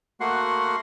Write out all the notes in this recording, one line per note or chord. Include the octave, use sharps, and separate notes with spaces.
A3 A#3 F#4 F#5 C6